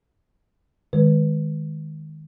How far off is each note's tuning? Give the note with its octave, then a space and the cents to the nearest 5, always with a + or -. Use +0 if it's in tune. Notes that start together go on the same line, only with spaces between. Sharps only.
D#3 +0 G#3 +5 B4 +0